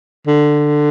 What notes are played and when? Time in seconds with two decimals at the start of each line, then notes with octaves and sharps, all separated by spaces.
0.27 D3